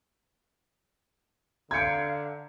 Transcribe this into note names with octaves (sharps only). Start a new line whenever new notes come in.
D3 F5 A#5 G6 G#6 C#7 D7